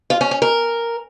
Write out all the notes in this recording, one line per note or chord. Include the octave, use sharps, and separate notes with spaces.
F4
C#4
C#4
A#4